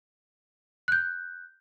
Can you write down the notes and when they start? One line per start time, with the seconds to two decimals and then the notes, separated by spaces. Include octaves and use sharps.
0.88 F#6 G6